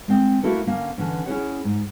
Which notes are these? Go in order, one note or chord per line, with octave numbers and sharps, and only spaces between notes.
G#3 C4
A3 A#3 E4 F#4 A4 A#4
D3 A#3 C#4
D3 E3 C#4
C#4 E4 F#4 G#4 C#5 F#5
G#2